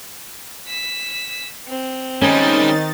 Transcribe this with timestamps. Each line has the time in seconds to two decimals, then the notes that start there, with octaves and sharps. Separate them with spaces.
0.67 B6 E7
1.68 C4
2.22 D#3 G3 G#3 C#4 D#4 A6